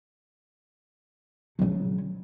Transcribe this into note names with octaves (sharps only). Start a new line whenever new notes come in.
C#3 F#3